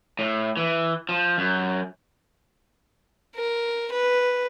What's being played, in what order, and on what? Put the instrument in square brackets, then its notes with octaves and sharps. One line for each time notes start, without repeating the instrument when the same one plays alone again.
[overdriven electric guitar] A2
E3
F3
F#2
[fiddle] A#4
B4